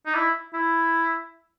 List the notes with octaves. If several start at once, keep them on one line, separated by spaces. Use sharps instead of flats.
D#4
E4
E4